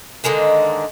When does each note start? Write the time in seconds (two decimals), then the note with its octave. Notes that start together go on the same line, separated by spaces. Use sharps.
0.24 D3 D#3 G#3 A#3